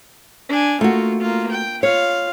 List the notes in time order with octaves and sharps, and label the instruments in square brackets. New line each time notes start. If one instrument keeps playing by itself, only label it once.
[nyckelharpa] D4 G#5
[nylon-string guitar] A3 F#4 [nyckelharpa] A#3 F4
[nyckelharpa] A#3 F4
G5
[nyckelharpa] F4 F5 [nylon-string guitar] C#5